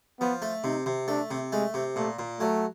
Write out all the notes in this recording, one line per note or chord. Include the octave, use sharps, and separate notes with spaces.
F3 B3
A3
C3 D#4
C3
A3 D4
C3
G#3 A3
C3
A#2 A3
A#2
F#3 A3